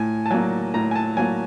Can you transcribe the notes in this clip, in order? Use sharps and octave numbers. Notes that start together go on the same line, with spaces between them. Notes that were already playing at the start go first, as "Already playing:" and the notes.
Already playing: A2 G#5
A5
F#3 A#3 G#5
A2 A#5
G#5
A5
F#3 A#3 G#5